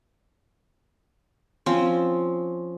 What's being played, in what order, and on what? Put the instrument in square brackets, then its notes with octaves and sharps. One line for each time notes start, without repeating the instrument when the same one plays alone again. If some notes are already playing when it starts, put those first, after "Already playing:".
[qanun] F3 C4 C#4